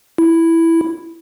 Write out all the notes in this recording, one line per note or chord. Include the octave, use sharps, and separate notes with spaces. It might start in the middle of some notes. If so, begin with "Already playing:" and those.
E4